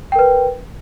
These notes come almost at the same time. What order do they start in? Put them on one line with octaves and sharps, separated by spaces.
G5 A#4 B4